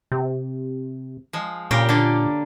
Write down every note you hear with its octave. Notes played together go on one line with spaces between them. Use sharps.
C3
F3 G#3
A#2 C#3 G4 A#4
D3 A#3 D5